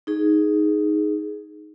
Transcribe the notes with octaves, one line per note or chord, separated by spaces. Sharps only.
D#4 G#4